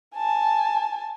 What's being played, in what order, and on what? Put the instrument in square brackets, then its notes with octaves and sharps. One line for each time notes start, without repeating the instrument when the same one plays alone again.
[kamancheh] G#5 A5